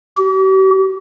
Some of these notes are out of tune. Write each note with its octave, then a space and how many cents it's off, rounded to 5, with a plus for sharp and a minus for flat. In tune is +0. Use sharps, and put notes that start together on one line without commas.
G4 -45